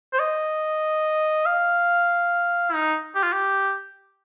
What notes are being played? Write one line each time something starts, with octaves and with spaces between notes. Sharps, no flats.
C5
D#5
F5
D#4
G4
F4
G4